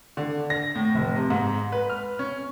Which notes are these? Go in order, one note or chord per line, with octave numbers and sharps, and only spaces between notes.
D3
A#6
A2
F1
C3
G#2
B4
F6
C#4